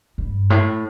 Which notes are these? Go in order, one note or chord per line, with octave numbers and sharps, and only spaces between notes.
G2
A2